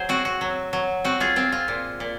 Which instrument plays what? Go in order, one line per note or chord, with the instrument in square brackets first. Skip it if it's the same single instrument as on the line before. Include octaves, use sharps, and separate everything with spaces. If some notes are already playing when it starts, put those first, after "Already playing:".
Already playing: [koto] F#3 G#4 C5
C4 F#4
F#4
F#3
F#3
C4 F#4
F4 G#4
C4 F4
F4
A#2
A#2